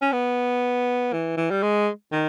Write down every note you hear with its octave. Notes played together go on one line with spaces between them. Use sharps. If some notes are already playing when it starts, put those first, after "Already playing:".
C#4
B3
E3
E3
G3
G#3
D#3